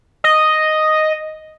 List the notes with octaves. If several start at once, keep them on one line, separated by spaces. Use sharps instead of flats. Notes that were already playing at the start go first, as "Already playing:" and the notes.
D#5